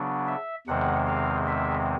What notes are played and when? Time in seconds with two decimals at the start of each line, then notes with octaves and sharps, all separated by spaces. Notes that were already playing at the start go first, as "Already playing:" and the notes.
Already playing: C#3 F#3 B3 D4
0.27 E5
0.67 E2 C3 D#3 G#3 C4 F#5
1.07 F5
1.48 E5